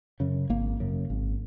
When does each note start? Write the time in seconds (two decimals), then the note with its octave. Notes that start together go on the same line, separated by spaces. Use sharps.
0.20 F#2 C#3
0.49 G#1 A#3
0.80 F#2 C#3
1.10 G#1